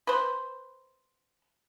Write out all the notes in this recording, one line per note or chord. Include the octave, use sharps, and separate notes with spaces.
B4 C5